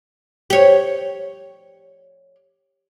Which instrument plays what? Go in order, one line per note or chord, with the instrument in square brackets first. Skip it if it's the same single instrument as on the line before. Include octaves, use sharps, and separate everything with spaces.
[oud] G4 C#5